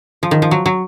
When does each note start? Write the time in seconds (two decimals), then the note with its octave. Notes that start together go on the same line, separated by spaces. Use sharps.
0.23 F3
0.31 D#3
0.42 F3
0.51 F#3
0.66 F#3